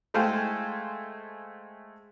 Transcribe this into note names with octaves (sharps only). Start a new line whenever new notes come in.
G#3 A3 C5 F5 G5 G#5